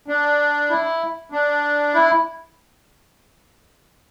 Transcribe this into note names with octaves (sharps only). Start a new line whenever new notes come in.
D4
E4
D4
E4